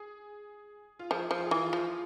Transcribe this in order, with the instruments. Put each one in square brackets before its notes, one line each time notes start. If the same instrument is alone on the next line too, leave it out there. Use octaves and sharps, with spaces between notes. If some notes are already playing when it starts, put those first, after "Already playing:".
Already playing: [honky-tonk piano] G#4
F4
[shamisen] F3 [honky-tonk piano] G#4
[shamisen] F3
[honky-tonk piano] F4
G#4
[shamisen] E3 [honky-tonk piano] F4
[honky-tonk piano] F4
[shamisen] F3